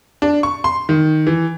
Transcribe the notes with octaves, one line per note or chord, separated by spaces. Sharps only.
D4
C#6
C6
D#3
E3